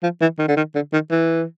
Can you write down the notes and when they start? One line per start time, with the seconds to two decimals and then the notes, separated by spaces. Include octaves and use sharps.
0.03 F3
0.21 E3
0.39 D#3
0.48 D3
0.56 D#3
0.75 D3
0.93 D#3
1.11 E3